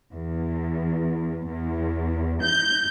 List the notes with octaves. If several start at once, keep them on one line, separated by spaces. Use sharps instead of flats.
E2
E2
G6